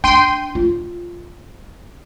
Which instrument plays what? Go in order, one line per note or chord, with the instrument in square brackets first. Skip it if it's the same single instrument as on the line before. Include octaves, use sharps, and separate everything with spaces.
[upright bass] D4 [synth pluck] G5 C6 D#7
[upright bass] F4